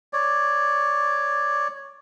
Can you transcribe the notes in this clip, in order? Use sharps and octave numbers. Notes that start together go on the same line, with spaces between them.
C#5 D5